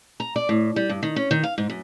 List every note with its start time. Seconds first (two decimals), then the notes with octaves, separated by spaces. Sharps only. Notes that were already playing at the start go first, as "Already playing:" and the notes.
0.20 A#5
0.36 D5
0.49 A2
0.76 G3
0.89 G2
1.03 D#3
1.16 C#4
1.31 D#3
1.43 F5
1.58 G#2
1.70 F#2